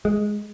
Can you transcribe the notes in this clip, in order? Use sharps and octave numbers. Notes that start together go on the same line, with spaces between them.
G#3